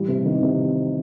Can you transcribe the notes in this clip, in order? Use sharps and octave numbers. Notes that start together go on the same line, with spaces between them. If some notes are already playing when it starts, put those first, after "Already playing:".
Already playing: A1 G3
C3
D#3
C3